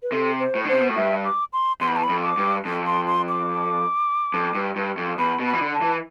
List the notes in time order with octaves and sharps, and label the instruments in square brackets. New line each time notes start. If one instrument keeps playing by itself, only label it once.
[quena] B4
[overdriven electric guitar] C3 [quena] A4
[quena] C5
[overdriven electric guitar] A2
D3
[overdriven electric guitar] C3 [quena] C5
[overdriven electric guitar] B2
A2
[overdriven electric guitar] G2 [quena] E5
[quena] D6
C6
[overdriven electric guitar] E2 [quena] C6
[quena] B5
A5
B5
[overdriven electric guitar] F2
[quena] D6
[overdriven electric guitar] G2
F2
[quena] C6
C6
D6
[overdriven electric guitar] F2
G2
G2
F2
[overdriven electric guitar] E2 [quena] B5
[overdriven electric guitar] B2
[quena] B5
[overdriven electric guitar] E3
D3
[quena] A5
[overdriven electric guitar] E3